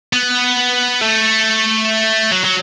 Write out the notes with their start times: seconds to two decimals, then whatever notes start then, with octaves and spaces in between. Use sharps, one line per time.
0.13 B3
1.01 A3
2.32 F#3
2.44 F#3